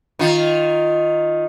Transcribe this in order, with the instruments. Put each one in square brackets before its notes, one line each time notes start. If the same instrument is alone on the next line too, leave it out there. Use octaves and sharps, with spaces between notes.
[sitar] D#3 F4